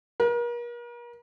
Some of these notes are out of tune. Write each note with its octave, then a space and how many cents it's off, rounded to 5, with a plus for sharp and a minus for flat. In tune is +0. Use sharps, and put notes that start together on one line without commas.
A#4 +40